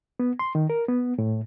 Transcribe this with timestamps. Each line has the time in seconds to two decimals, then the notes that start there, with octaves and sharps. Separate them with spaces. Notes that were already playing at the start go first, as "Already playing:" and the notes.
0.20 B3
0.39 C6
0.55 D#3
0.70 A#4
0.89 B3
1.18 A2